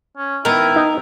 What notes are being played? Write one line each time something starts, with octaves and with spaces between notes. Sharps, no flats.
C#4
D#3 B3 E4 A#4
D#4